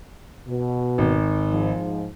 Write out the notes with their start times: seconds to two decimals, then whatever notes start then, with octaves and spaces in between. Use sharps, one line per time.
0.48 B2
0.98 G#1
1.50 G#2 F3